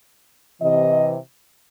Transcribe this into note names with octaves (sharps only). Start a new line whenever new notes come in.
C3 E3 D#5